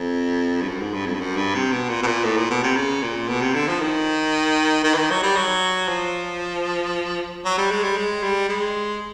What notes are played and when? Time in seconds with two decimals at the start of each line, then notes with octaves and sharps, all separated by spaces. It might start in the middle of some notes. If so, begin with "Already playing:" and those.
Already playing: F2
0.62 G2
0.68 F#2
0.81 G#2
0.93 G2
1.06 F2
1.14 G2
1.20 F#2
1.36 G2
1.55 C3
1.72 B2
1.89 A#2
2.02 B2
2.06 A#2
2.24 A2
2.37 A#2
2.50 B2
2.63 C3
2.76 C#3
3.02 A#2
3.28 B2
3.41 C3
3.54 D3
3.67 F3
3.80 D#3
4.84 D#3
4.93 E3
4.97 D#3
5.10 F#3
5.23 G3
5.36 F#3
5.88 F3
7.45 F#3
7.58 G3
7.71 G#3
7.83 G3
7.97 G#3
8.23 G3
8.49 G#3